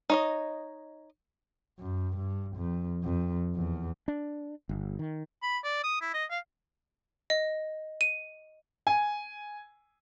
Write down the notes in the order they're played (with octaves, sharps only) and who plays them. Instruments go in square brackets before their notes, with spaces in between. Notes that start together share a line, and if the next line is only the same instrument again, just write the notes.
[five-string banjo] D#4 C#5 D#5
[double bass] F#2
G2
F2
F2
E2
[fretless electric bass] D4
G1
D#3
[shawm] B5
D5
D#6
E4
D#5
F5
[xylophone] D#5
D#7
[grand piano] G#5